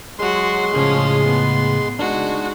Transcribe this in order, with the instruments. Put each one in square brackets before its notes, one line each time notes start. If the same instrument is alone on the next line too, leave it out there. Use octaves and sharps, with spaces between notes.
[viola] F#3 F#4 [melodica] G#3 C6
[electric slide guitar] A2 C#3 G#4 [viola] F3 C#4
[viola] B3
[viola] G#3 F#4 [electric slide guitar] D4 D#4